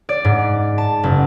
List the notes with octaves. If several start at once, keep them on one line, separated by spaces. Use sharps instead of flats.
D5
G#2
A5
F#1